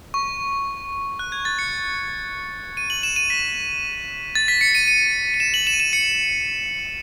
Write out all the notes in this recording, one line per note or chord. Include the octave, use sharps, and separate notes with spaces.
C#6
F#6
G#6
A6
C#7
D#7
F#7
E7
D#7
B6
A6
B6
C#7
D#7
D#7
D#7
E7
F#7
E7
D#7
E7
C#7